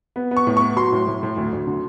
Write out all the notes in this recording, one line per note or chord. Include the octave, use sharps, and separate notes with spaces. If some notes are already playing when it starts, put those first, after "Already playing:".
B3
B3
C#6
A2
B3 C#6
F#3 C6
A2
A2
A2
D2
D2
D3